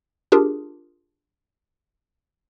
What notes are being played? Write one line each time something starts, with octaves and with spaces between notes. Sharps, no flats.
D4 F4 G4 G#4 A#4